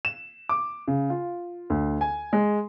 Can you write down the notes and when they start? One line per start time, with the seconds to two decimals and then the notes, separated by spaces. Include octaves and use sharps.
0.05 E7
0.49 D6
0.88 C#3
1.10 F4
1.70 D2
2.01 G#5
2.33 G#3